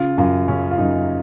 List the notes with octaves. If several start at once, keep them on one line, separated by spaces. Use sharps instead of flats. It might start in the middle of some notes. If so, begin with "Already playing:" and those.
Already playing: C#3 F4
F#2 F4
C#3 C#4
F4
F#2 D#4